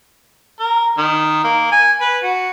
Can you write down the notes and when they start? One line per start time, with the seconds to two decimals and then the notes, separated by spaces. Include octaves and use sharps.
0.59 A#4
0.98 D#3
1.44 A#3
1.72 G#5
2.01 B4
2.23 F#4